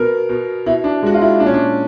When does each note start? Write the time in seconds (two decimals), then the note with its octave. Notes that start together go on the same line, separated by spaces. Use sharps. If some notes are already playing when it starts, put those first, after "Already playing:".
Already playing: B2 B3 A#4
0.29 B2
0.66 B2 E4
0.84 D4
1.03 G#3 F#4
1.14 F4
1.21 E4
1.39 A#2 D4
1.46 C#4
1.54 D4